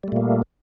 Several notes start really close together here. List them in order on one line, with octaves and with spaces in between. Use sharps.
G3 A3 A#2 A#3